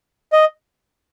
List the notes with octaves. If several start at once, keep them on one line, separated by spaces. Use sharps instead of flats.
D#5